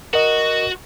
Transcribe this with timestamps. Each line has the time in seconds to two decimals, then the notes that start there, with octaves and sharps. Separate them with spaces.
0.13 F#4 A#4 D#5